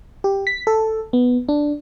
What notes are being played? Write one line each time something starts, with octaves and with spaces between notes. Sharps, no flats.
G4
B6
A4
B3
D4